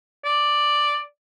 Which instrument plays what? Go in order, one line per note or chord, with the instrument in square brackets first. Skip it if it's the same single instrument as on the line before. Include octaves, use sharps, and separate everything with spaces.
[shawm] D5